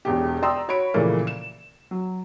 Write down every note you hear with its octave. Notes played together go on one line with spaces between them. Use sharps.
E1 E2 B2 G4
D5 G5 A#5 C6 D#6 E6
F#4 C#5 B5 D7
A#2 C#3 E3 F3 A3 A#3
E7
F#3